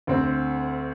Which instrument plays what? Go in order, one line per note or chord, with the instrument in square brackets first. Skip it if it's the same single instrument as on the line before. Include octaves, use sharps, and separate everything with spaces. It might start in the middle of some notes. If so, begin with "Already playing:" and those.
[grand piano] D2 C4 C5